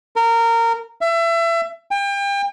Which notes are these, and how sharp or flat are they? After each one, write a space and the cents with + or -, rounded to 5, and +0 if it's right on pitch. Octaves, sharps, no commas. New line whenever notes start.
A#4 -20
E5 +30
G5 +35